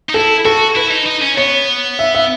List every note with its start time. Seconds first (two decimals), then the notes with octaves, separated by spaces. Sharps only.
0.09 D#4
0.14 E4 A4
0.45 F#4 A4
0.76 E4 B4
0.91 D#4
1.06 D#4
1.23 C#4
1.37 B3 C#5
1.99 E5
2.15 E5